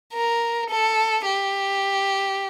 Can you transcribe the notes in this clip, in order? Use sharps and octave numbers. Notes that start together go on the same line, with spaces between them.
A#4
A4
G4